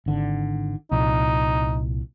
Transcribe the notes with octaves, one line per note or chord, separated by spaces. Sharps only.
G#1 D3
C2 A#2 F3 D#4